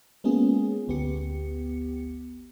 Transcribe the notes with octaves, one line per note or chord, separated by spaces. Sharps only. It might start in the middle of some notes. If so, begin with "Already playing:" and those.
G#3 A#3 B3 C#4 F4 G#4
G1 D2 B3 G4 C#7